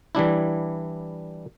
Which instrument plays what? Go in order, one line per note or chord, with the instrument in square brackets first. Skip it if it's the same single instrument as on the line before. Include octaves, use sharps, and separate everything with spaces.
[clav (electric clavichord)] E3 G3 D4 E4